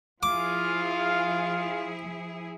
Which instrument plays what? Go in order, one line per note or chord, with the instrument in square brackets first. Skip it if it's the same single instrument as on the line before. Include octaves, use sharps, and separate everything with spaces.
[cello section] F3 E4 G#4 [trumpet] F4 [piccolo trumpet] F5 [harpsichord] D6